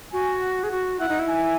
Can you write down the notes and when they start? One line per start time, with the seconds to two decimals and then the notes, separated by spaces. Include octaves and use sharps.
0.12 F#4 G#5
0.42 F#5
0.64 G#4
0.71 F#4
0.99 E4 F#5
1.09 D#4
1.19 E4
1.28 G#5